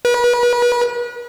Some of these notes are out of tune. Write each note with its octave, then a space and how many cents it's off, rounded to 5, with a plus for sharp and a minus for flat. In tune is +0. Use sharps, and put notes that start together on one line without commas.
B4 -35